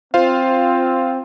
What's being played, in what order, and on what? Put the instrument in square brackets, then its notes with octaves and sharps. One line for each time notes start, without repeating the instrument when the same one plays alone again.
[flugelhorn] C4 [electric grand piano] F4 C5 F5